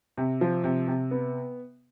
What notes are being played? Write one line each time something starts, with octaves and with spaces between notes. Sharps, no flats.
C3
F3
C3
C3
B3